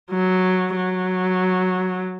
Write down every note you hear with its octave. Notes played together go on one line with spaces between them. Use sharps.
F#3
F#3